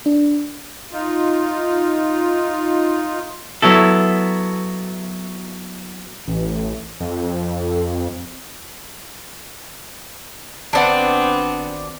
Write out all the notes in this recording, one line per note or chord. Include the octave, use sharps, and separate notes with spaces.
D4
D#4 F4
F#3 B3 E4 A4
A1
F2
G#1 B3 C4 D4 D5 F#5